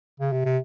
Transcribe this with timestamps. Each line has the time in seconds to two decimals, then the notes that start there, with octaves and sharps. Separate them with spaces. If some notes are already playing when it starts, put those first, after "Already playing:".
0.20 C#3
0.32 C3
0.45 C3